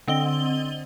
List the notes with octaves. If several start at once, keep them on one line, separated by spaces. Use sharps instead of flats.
D3 C4 D#5 G7